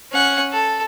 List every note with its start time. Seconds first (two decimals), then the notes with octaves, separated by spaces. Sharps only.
0.12 C#4 F#5
0.52 A4